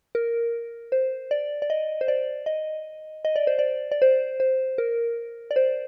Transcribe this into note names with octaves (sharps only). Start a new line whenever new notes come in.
A#4
C5
D5
D5
D#5
C5
D5
D#5
D#5
D5
C5
D5
D5
C5
C5
A#4
D5
C5